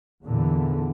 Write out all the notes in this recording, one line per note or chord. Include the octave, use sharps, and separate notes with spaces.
E2 A#2 D3 E3